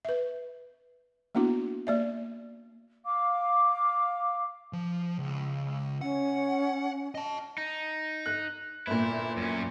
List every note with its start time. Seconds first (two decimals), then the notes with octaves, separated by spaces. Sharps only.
0.05 B4 E5
1.35 A#3 B3 D4 E4 F#4
1.87 A#3 D5 E5
3.05 F5 D6
4.73 F3
5.19 C#2
6.01 C#4 F#5
7.15 D#5 A5
7.58 D#4
8.26 F#6
8.87 G1 A#2 E4
9.37 F#2 C#4